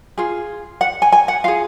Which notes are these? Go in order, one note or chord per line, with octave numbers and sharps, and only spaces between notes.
F4 G#4
F#5
G#5
G#5
F#5
F4 G#4 F5